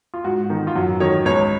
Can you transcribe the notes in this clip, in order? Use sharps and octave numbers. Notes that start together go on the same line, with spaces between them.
F4
G#2 F#4
D#3
F4
F#2 F#4
D#3 C#5
C#2 C#5